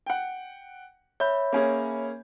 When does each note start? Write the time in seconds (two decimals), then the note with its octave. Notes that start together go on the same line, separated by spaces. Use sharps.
0.06 F#5 G5
1.20 C#5 E5 B5 G6
1.52 A#3 C#4 G#4